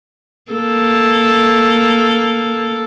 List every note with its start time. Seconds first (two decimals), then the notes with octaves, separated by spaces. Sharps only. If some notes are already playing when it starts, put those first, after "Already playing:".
0.52 A#3 A4